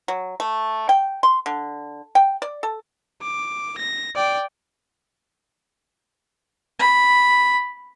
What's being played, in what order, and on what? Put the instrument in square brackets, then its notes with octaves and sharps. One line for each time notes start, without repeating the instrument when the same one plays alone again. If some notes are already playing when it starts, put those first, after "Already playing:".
[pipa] F#3
A3
G5
C6
D3
G5
D5
A4
[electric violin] D6
A#6
D5 G5
[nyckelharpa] B5